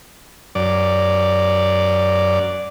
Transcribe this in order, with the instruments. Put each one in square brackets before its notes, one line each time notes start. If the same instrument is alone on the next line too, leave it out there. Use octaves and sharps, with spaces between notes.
[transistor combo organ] F#2 D5